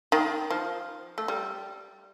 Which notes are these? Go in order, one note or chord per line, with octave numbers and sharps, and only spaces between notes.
D#3
F3
A3
G3